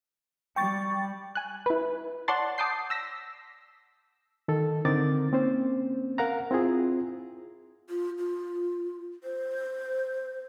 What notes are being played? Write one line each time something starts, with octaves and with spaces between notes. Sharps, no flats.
G3 G5 C#6 A6
G#5 F#6
E4 B4
C#5 D5 F#5 A5 C6 A6
A5 D6 D#6 G6 C7
E6 A#6 B6
D#3 A4
D3 C4 D#4 A#4 D6 A6
A#3 C4 C#4 C5
A#4 F5 F#5 A#5
C4 E4 F4 G#4
F4
F4
C5